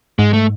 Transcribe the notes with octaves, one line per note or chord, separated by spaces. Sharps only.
G#2 G#3
A3